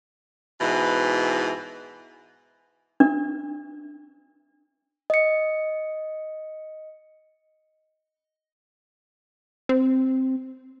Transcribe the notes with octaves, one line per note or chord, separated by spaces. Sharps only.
G#2 B2 E3
D4
D#5 C#7
C4